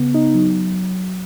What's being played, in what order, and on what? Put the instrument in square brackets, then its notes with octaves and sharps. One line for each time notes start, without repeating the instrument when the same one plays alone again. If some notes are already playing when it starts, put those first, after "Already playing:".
Already playing: [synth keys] C#3 B3
D#4
F#3